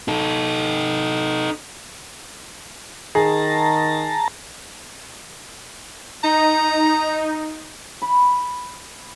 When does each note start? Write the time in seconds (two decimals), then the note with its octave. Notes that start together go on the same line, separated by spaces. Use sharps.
0.08 D#4 A4
3.15 D#3 G#4 A5 A#5
6.24 D#4 A#5
8.02 B5